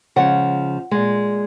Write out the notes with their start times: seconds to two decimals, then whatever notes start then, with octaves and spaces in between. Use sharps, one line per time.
0.16 C#3 F3 G#3 F#5
0.91 A#2 G#3